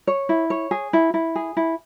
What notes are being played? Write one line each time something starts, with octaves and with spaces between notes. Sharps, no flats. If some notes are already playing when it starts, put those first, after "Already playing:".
C#5
E4
C#5
G#4
E4
E4
G#4
E4